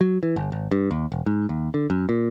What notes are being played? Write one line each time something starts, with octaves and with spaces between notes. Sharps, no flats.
F#3
E3
G1
G#1
G2
D#2
E1
G#2
D#2
D3
F#2
A#2